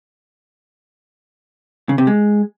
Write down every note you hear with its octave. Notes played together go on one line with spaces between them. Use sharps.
C#3
C3
G#3